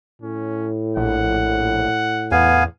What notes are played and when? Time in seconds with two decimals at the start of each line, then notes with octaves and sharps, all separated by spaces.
0.22 A2 C#4
0.97 A#1 F#5
2.31 E2 B3 F5 G#5